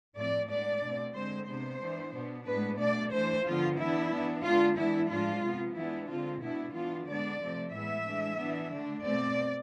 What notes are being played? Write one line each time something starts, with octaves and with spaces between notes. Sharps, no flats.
A2 F3 A3 C4 D5
A2 G#3 B3 D4 D5
B2 A3 C4
D3 G#3 C4 C5
C3 G#3 B3 D4 C5
E3 B3 D4
B2 B3 D4
A2 G#3 B3 D4 B4
B2 A3 D4 D5
E3 A3 D4 C5
D3 F3 B3 F4
E3 B3 D4 E4
E3 B3 D4
D3 G#3 B3 D4 F4
E3 G#3 B3 D4 E4
A2 F3 G#3 D4 F4
C3 F3 B3
E3 G#3 B3 D4 E4
D3 G#3 C4 F4
B2 B3 D4 E4
E3 B3 D4 F4
D3 G#3 B3 D4 D5
C3 F3 A3 C4
A2 E3 G#3 B3 E5
E3 G#3 D4
E3 B3 D4
D3 A3 D4
B2 A3 C4 D5